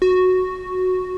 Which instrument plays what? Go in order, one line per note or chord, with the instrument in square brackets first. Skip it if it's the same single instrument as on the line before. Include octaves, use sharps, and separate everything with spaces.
[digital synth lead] F#4